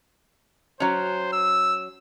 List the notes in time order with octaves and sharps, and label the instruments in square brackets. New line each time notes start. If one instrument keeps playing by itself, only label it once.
[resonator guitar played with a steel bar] F#3 C#4 [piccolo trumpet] C5
[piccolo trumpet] E6